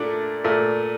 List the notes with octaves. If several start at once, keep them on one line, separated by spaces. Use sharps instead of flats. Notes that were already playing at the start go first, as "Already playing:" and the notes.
Already playing: A#2 A3 D4
A#2 A3